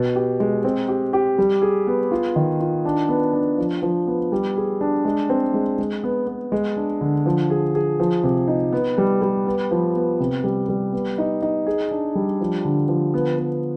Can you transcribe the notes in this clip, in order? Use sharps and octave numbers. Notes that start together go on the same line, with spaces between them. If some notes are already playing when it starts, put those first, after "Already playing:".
Already playing: B2
G4
G#3
C4
G4
G4
G3
G#4
B3
F4
D#3
F4
D4
B3
D4
F3
F3
B3
G3
G#4
D4
G#3
C4
G#3
G#3
B3
B3
G#3
D4
D3
F3
G#4
G#4
F3
C3
D#4
B3
G3
G3
B3
F3
B3
C3
G3
G3
B3
D#4
D#4
G#4
D4
G3
F3
D3
F3
B3
B3